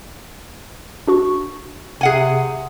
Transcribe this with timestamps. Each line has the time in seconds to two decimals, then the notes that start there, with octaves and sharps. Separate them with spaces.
1.07 D4 F#4 C#6
2.01 C3 G#4 F#5 G#5